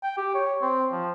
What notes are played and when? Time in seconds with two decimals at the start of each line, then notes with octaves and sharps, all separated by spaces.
0.03 G5
0.17 G4
0.34 C#5
0.62 C4
0.92 F3